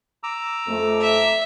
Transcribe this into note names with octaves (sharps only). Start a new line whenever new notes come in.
A#5 D6 E6
F2 A3
E5